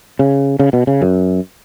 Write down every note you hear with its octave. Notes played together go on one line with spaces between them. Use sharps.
C#3
C#3
B2
C#3
F#2